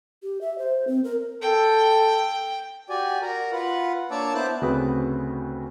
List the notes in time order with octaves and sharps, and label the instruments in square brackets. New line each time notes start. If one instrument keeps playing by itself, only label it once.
[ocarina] G4
E5
C5
C4
A#4
[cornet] A4 [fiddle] G5
[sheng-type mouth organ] F#4 G4 D5 G#5
F#4 A#4 A#5
F4 B4 F#5
A#3 D4 C#5 A5 D6 E6
B3 E4 C5 A5 D6 F#6
[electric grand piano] D2 C#3 C4 F#4 B4 D#6